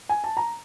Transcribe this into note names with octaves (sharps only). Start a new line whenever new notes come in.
G#5
A5
A#5